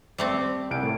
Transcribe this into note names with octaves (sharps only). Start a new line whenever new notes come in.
G3 A3 C4
C2 D7
A2